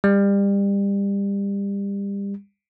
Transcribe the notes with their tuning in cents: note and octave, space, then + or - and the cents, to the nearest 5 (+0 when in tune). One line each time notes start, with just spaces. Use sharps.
G3 +30